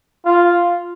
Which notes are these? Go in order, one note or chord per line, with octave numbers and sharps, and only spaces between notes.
F4